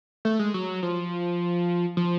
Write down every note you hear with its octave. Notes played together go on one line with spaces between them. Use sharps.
A3
G#3
F#3
F3
F3